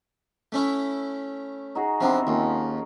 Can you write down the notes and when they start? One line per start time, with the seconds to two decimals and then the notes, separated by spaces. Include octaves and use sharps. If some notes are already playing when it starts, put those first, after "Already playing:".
0.52 A3 C#4 E4
1.75 D#4 F#4 G#4
2.01 C3 F3 B3 C4 D4
2.27 D#2 F3 C#4 A#4